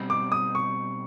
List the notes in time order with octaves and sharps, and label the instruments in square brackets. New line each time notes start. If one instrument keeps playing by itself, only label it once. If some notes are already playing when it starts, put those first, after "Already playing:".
Already playing: [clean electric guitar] B2 G3 C4 D#4
[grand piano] D6
D#6
C#6